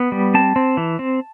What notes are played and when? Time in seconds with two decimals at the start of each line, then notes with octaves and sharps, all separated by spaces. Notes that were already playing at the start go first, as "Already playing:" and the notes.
Already playing: B3
0.12 G3
0.34 C4 A5
0.56 C4
0.77 E3
0.99 C4